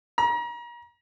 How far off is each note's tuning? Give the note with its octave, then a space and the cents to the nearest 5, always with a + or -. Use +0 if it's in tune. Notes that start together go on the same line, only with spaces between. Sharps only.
A#5 +35